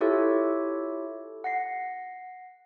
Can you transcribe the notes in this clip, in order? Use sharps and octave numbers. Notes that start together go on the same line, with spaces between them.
E4 F4 G4 A4 C#5 E5
F#5 A#6 C7